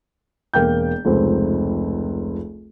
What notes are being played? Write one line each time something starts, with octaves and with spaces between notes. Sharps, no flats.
E1 A#3 G5 G6
F1 C#2 C4